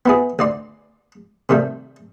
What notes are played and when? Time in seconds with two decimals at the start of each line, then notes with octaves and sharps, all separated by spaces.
0.06 B3 E4 G#4
0.39 D2 D5 C6
1.49 C3 D#3 G3 A3